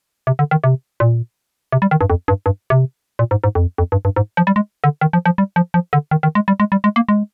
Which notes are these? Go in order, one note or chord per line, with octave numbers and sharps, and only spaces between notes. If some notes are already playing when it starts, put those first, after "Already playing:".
C3
D3
D#3
C3
A#2
C3
G3
D#3
G2
F2
G2
G2
C3
A#2
G#2
G#2
F2
F2
G2
G2
G#2
F3
G3
G#3
D3
D#3
F3
F3
G3
F3
F3
D3
D#3
D#3
G#3
G3
G#3
G3
G#3
A#3
G#3